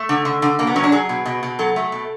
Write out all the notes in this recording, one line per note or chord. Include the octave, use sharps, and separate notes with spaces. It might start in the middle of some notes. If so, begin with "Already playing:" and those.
Already playing: A3
D3
D3
D3
B2 A#3
B3
F#3 C#4
D4
F#3 G#4
B2
B2
B2
F#3 A4
A3
B2